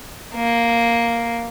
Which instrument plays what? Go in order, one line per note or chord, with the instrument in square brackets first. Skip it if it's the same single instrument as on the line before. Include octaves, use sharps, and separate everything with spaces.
[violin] A#3